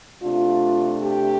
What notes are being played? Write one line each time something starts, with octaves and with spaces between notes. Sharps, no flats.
C3 A3 D4 F4
G4